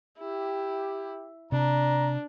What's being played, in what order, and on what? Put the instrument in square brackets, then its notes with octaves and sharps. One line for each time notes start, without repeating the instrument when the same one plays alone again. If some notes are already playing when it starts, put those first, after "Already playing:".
[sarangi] E4 [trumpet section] G4
[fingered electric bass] C3 [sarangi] D4 [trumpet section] A#5